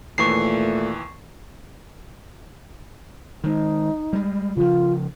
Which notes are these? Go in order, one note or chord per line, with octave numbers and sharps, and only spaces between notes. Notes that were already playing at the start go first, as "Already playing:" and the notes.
D#2 A#2 E3 A3 C#6 C7
D#3 G#3 D#4
G3 G#3
C#3 F3 F4